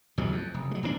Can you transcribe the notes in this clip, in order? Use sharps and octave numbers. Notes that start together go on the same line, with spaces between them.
A1 D#2 G#2 F#3
F2
F1
F#3 G#3
D#1 E2 D#3 D4